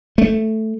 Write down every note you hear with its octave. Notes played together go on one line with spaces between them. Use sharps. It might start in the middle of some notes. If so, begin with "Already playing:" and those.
A3